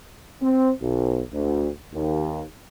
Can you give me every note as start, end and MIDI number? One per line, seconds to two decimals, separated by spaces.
0.42 0.70 60
0.81 1.22 35
1.32 1.69 38
1.93 2.43 39